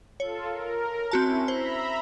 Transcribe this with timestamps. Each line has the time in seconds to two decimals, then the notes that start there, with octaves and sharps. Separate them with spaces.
0.20 F4 A4 C#5
0.50 A#4
1.11 C4 C#4 E4 F#4 A5
1.48 C5 E5 A#5 B5